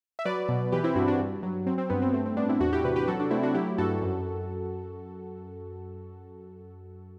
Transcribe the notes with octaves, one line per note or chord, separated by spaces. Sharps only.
E5
F#3 B4 D5
B2
E3 G4 B4
C4 E4
G2 D4 F#4
D4 F#4
G2
F#3
F#3 C4
C4
G2 B3
C4
A3 C4
C4
A2 B3 D4
C4 E4
E2 D4 F#4
E4 G4
C3 G4 B4
G4 B4
F#3 F#4 A4
D4 F#4
A3 C4 E4
D4 F#4
F#3 E4 G4
G2 F#4 A4
F#2